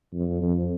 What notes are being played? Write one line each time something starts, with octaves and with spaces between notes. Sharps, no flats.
F2
F2